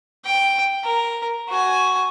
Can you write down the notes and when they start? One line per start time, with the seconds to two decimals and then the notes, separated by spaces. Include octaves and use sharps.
0.25 G5
0.83 A#4
1.49 F#4 G#5